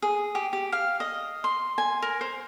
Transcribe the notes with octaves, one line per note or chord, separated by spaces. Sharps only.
G#4
G4
G4
F5
D#5
C6
G#5
A#4
C5